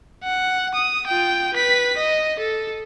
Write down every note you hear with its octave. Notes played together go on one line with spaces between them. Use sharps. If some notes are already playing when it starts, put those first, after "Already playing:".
F#5
D#6
F4 G5
B4 B6
D#5
A4